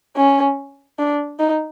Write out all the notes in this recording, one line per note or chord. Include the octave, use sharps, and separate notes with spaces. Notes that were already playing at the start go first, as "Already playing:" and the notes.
C#4
D4
D#4